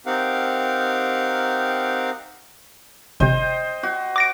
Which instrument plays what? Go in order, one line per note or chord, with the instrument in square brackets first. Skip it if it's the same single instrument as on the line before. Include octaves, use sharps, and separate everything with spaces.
[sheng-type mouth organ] C4 D#4 G4 A#4 F5 F#5
[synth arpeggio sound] G1 C3 [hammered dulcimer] C5 D#5 G5
[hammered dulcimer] F#4
[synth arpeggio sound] D6 A#6 D7